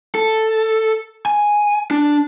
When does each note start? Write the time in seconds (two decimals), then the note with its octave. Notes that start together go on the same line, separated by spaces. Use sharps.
0.15 A4
1.26 G#5
1.91 D4